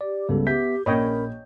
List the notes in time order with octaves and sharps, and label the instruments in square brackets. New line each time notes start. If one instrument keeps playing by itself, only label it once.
[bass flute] G4 [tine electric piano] D5
[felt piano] C#2 [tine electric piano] G3 B3 A4
[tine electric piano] B3 E5 B6 [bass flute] G4 [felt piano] G6
[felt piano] A#1 [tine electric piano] C#4 B5 [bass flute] A#4 [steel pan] C#5 D#5 G5